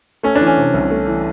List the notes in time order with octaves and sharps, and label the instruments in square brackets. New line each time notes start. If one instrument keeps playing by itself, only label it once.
[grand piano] A3 [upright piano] C#4
[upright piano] D4
[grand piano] E3
[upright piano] C#4
[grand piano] C3
C2
A3
E3